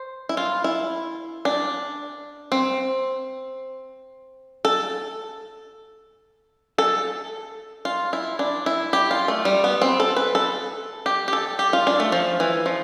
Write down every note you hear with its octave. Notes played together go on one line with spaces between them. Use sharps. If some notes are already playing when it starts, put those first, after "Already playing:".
Already playing: C5
E4
F4
E4
D4
C4
A4
A4
F4
E4
D4
E4
G4
F4
A3
G3
B3
C4
A4
B4
A4
G4
G4
A4
G4
F4
D4
A3
F3
E3
F3